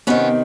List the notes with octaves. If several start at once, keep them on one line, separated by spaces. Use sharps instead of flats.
C3 D#3 B3 C#4